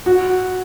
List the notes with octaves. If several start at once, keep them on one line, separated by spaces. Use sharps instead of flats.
F#4